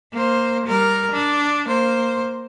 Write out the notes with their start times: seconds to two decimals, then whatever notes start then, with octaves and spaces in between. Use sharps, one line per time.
0.13 A#3 C5
0.66 G3 A#4
1.12 D4
1.68 A#3 C5